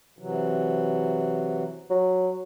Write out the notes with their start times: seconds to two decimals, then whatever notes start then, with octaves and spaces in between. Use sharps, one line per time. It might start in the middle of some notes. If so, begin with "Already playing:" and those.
0.19 C3 E3 F#3
1.90 F#3